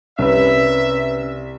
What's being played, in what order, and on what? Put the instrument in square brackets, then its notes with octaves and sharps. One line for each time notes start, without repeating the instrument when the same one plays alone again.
[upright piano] C2 [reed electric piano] C#4 B4 [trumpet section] E5